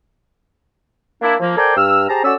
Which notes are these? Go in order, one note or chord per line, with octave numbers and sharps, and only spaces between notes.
A#3 D4 E4
F3 A#3
A4 A#4 C5 D5 G5 G#5
G2 E6 F6
G4 G#4 C5 A5 A#5
C#4 F#4 A4 D5 E6